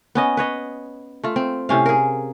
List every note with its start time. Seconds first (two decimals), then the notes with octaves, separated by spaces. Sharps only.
0.15 B3 C#4 D#5
0.37 B4 C#5 D#5
1.24 A3 F4
1.36 C4
1.69 A2 C3 C#4 F5
1.86 G#4 A#4